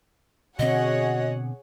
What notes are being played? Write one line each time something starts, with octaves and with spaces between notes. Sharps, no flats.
B2 D3 C4 F#4 G#4 C#5 D#5 F#5